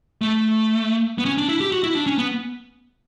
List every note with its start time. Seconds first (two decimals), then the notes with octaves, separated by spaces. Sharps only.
0.22 A3
1.18 B3
1.25 C#4
1.37 D4
1.49 E4
1.60 G4
1.72 F#4
1.83 E4
1.95 D4
2.07 C#4
2.18 B3